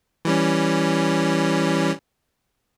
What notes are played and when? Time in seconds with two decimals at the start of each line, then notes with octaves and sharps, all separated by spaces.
0.25 E3 G3 C#4